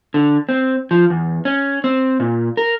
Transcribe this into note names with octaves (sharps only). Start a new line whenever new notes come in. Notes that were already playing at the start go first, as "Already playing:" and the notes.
D3
C4
F3
E2
C#4
C4
A#2
A#4